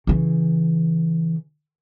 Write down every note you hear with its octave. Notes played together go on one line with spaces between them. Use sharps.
C#3 E3